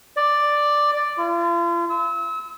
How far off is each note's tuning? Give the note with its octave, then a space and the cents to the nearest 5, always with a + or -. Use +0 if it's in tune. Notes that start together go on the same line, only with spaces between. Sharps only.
D5 +5
F4 -40
E6 -35